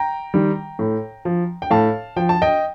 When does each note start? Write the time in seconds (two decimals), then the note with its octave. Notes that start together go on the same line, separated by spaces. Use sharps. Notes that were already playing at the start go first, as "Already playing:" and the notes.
Already playing: G5 A#5
0.34 D#3 G3
0.79 A2
1.25 F3
1.62 G5
1.70 A2 F5 A5
2.16 F3 G5
2.29 A5
2.42 D#5 G5